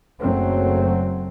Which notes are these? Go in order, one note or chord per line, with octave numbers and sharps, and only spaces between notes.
F#1 F#2 F#3 A3 C4